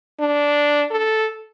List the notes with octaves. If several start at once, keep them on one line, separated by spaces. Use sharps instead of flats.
D4
A4